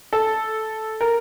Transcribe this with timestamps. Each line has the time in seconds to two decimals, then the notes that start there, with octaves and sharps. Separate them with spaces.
0.13 A4
1.01 A#4